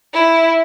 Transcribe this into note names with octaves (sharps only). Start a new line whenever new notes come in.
E4